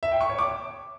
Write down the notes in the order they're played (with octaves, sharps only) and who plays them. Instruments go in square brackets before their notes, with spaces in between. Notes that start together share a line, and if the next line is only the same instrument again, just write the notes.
[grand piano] E5
G5
C#6
C#5
D6